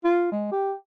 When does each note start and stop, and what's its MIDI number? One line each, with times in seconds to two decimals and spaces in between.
0.04 0.28 65
0.32 0.49 56
0.52 0.73 67